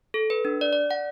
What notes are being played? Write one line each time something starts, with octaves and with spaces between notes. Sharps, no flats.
A4
B4
D4
D5
D5
F#5